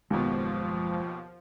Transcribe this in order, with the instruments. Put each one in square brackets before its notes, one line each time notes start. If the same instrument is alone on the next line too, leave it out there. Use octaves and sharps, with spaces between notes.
[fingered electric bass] F#1 G#3 [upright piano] D#2 B2 [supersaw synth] F3